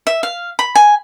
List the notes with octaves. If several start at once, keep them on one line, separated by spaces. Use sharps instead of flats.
E5
F5
B5
G#5